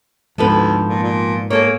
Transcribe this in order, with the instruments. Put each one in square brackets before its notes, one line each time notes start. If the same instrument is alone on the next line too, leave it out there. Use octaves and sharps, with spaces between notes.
[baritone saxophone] D2 [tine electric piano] G#2 B3 [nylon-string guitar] F3 A4 B4
[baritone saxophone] A#2
A#2
[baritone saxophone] A#3 [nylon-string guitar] G#4 A4 C#5